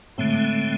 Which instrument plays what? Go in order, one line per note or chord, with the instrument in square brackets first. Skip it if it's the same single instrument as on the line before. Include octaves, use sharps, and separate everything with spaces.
[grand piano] A2 [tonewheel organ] D3 G#3 C4